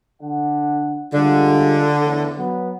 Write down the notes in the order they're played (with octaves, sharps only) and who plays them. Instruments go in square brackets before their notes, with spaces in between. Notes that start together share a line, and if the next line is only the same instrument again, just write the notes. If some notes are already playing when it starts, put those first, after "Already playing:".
[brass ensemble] D3 F#5
[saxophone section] D3 [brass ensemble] G3 G#3 F4
[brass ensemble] E2 A2
F#3 B3